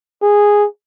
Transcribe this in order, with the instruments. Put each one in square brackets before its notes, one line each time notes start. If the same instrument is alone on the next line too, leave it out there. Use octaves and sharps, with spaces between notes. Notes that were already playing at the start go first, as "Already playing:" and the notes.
[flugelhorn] G#4